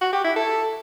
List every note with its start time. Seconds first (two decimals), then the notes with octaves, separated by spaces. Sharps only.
0.01 F#4
0.13 G4
0.24 E4
0.36 A4